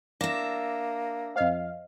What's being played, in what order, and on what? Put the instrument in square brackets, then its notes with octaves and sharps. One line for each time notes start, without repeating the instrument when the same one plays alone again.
[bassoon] A#3 [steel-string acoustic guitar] D4 E5 [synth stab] A#6
[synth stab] F2 F5 [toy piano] C5 D#5